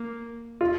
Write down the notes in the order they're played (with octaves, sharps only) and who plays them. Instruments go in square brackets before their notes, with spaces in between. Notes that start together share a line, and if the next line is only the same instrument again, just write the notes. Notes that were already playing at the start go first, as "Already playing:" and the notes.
Already playing: [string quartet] A#3
[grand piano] F4